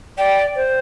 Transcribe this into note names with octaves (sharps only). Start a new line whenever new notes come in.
D5 G5
C5